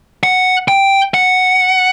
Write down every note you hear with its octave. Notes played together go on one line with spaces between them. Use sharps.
F#5
G5
F#5